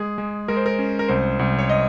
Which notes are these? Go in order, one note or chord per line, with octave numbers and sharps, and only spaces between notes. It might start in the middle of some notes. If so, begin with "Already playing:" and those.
Already playing: G#3 G#4
G#3
G#3 A#4
C5
A#4
C#4
A#4
C2 C5
C2
C#5
D#5